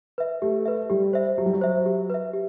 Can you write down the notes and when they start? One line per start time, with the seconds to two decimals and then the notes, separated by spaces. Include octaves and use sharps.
0.18 B4 E5
0.42 A3 G4
0.66 B4 E5
0.90 G3 G4
1.13 C5 E5
1.38 F#3 G4
1.46 G3
1.53 F#3
1.61 C5 E5
1.86 G4
2.10 B4 E5
2.34 G4